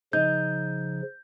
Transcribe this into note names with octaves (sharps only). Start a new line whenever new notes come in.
C#3 F3 D#4 G6